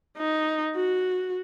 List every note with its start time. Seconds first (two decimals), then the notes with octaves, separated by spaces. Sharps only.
0.18 D#4
0.76 F#4